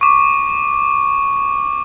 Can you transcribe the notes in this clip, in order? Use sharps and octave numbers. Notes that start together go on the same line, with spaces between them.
C#6 D6